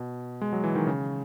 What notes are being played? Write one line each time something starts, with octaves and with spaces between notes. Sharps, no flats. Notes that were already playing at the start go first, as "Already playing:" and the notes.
Already playing: B2
G#3
F#3
E3
D#3
C#3